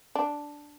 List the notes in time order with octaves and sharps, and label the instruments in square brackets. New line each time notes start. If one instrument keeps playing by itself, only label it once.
[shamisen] D4